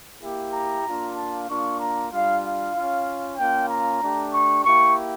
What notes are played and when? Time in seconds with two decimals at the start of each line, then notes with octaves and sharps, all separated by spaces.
0.21 A#3 E4 G4
0.53 A#5
0.85 A#3 D4 F4
1.16 A5
1.48 A#3 D4 F4 C#6
1.79 A#5
2.11 G3 D4 F4 F5
2.44 F5
2.75 C#4 F4
3.38 A#3 C#4 F4 G5
3.69 A#5
4.00 A3 D4 G4
4.33 C#6
4.64 A#3 E4 G4 C#6